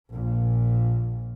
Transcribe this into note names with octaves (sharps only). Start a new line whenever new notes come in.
A#1 A#2